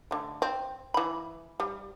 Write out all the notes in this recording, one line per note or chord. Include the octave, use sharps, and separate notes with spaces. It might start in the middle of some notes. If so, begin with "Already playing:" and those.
D3 A3
C4
E3 B5
G3